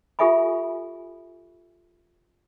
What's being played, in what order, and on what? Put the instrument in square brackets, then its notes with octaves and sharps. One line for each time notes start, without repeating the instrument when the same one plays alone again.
[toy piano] F4 G4 A4 E5 G#5 B5